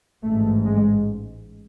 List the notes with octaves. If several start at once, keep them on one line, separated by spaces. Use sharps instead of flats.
A1 G#2 A3
G#3